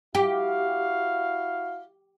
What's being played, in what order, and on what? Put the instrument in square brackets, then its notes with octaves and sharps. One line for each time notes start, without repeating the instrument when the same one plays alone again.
[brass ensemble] E4 F#4 F5 [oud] G4